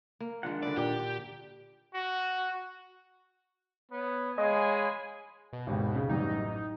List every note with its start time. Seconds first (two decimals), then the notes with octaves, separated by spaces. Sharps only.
0.20 A#3
0.43 D#3 F3 G#3 D4 F#5
0.63 D3 B4 D5 E5
0.77 A#2 G4 D5 G5
1.94 F#4
3.92 B3 C#5
4.38 G#3 C#5 D#5 F5 G#5 B5
5.53 B2
5.67 G#1 D#2
5.95 C#3
6.09 A1 F#2 G3 D#4